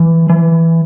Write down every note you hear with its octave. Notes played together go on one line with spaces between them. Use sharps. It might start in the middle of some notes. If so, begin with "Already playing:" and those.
Already playing: E3
E3